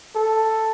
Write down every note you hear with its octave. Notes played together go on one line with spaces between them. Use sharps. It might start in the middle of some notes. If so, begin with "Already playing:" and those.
A4